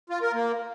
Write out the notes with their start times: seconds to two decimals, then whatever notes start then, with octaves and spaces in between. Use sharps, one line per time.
0.10 F4
0.21 A#4
0.33 A#3